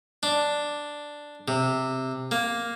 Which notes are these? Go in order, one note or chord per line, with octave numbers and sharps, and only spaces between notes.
D4
C3
A#3